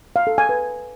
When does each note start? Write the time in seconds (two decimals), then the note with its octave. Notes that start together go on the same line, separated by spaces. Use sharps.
0.16 F5
0.27 A4
0.38 G#5
0.49 B4